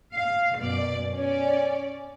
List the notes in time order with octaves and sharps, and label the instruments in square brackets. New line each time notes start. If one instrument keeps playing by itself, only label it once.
[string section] F5
F#2 B2 D5
C#4 D5